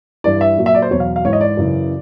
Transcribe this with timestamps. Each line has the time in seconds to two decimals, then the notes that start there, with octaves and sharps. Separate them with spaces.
0.24 G2 E3 D5
0.41 E5
0.58 A#2 F#3
0.66 E5
0.75 D5
0.82 C5
0.91 E2 B2 F#3 C#5
1.00 F5
1.16 F5
1.25 G#2 E3 C#5
1.33 D#5
1.41 D5
1.57 F#2 C#3 E3